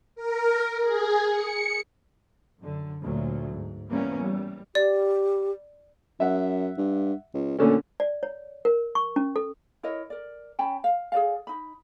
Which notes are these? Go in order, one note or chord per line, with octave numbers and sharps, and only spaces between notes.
A#4
G#4
C#7
F#2 D3
D2 A#2 F#3
G#2
E3 G3 A#3 B3 C#4
G3
G4 D5
F#2 E5 F#5
G2
C#2
D2 A#2 D3 C#4
D5
C#5
A#4
C#6
C#4
A4
E4 A#4 C#5 D#5
A#4 D5
C#4 G5 A5 B5
F5
G#4 B4 D5 F5
D#4 B5